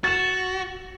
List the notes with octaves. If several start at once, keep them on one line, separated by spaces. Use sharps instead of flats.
F#4 A6 E7